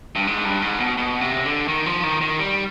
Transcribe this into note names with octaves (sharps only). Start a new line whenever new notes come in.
G2
G#2
G2
G#2
B2
B2
C3
D3
D#3
F3
D#3
D#3
G3